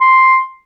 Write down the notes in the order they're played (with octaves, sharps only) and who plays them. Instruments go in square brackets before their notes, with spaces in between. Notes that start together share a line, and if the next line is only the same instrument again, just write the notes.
[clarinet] C6